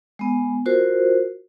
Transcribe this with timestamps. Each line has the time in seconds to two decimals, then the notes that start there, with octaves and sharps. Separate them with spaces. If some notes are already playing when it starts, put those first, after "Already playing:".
0.19 G#3 B3
0.66 F4 F#4 A#4 C5